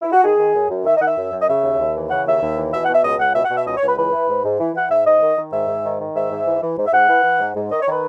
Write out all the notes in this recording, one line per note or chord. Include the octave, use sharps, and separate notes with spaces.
E4
F#4
D#3 G#4
D#3
F#2
F#2
D#3 E5
D#5
D#3 F#5
E5
F#2
F#2
D#5
C#3 E5
D#2
D#2
E3
C#3 F#5
D#2 E5
D#2
E3
B2 E5
F#5
B2
E5
C#2 D#5
C#2 F#5
B2 E5
F#5
B2
E5
C#2 D#5
C#5
C#2 B4
E3 B4
E3
G#2
G#2
E3
E3 F#5
G#2 E5
G#2 D#5
D#3
D#3
G#2 E5
G#2
D#3
D#3
G#2 E5
G#2
E3
E3
G#2
E5
G#2 F#5
E3
E3
G#2
G#2
D#3 D#5
C#5
D#3 B4